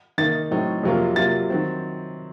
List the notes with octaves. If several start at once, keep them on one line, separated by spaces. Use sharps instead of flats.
D#3 A#3 D#4 A6
A2 F#3 C4 D#4
F2 C3 F#3 A#3 F4
C3 F#3 A#3 F4 A6
D#3 F#3 C4